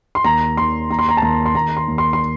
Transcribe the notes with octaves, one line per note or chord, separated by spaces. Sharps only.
C6
D#2 A#5
D#2 C6
D#2 A#5
C6
A#5
A5
D#2 A#5
C6
D#2 A#5
C6
D#2
C6
C6